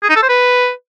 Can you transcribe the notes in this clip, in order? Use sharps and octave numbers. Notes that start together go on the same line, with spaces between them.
G#4
D#4
A4
C5
B4